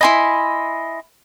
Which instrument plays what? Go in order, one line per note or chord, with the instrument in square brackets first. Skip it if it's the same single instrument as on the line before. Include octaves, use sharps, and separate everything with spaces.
[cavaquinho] E4 G#5 B5 [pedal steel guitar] D#5 C6